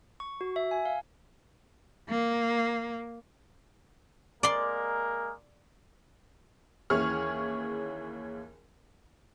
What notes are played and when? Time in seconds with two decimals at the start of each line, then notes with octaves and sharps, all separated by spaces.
0.20 C#6
0.41 F#4
0.56 E5
0.71 G#5
0.85 F5
2.09 A#3
4.43 G#3 A#3 A#4 D5 C6
6.90 D#2 E3 C#4 G#4 C#6 F6